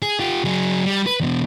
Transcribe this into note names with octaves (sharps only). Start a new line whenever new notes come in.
G#4
F4 G4
F#3 G#4
G3
B4
E2 B2